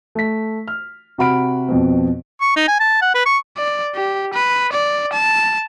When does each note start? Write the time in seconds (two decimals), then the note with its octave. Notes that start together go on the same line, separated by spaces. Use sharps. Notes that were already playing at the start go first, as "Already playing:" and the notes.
0.15 A3 B6
0.68 F6
1.18 C3 F#4 F#5 B5 F6 D7
1.69 F2 B2 C4
2.41 C#6
2.57 D#4
2.68 G#5
2.80 A5
3.02 F#5
3.15 B4
3.26 C#6
3.57 D5
3.95 G4
4.34 B4
4.73 D5
5.13 A5